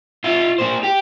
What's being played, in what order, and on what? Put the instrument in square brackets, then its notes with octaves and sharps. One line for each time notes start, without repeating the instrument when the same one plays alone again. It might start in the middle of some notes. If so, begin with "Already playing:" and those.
[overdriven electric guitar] F4 E5
A#3 C5
G4